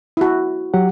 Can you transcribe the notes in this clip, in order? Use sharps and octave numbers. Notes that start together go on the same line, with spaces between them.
E4 F#4
F#3 G4 F#5